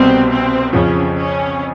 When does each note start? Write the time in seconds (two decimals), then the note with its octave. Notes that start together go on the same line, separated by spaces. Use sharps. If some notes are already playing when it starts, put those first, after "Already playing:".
Already playing: C2 B2 G3 C4
0.31 C4
0.73 F2 C#3 F3 C#4
1.17 C#4